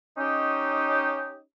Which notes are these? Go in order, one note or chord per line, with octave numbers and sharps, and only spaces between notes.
C#4 D#4 G4